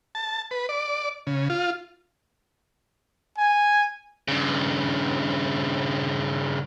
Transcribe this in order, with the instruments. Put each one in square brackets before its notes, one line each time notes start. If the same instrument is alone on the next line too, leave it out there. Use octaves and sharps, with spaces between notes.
[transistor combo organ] A5
B4
D5
C#3
F4
[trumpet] G#5
[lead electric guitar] G2 C#3